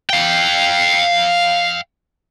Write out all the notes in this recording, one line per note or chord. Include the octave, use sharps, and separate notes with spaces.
F5 G5